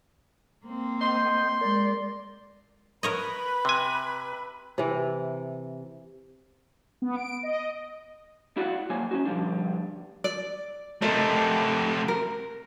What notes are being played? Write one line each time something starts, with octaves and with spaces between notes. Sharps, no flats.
A#3 C4
D#5 C6 G6
G#3 A#4 D5
A#4 B4 C#5 D#5 B5
C3 G#5
C3 E3
B3
D7
D#5
E4 F#4 D5 D#5 F5 F#5
D#2 F#3 A#3 C5 G#5
C#4 D#4 F#4
B2 D3 F3 G3 D4
D5
C3 A3 A#4 C5 D#5
A#4